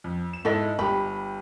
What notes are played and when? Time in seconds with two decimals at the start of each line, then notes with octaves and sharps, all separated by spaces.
0.04 F2
0.33 E7
0.45 G#2 E4 A4 D#5
0.79 G1 G4 B5